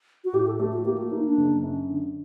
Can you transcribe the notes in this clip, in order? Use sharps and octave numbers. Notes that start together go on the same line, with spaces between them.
F#4
A2 G4
A4
A3 G4
F#4
A#3 G4
F#4
A#3 D#4
D4
F#1
F#2
D3